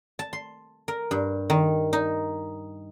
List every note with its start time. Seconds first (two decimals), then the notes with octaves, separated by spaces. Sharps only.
0.19 A5
0.33 C6
0.88 A#4
1.11 G2
1.50 D#3
1.93 D#4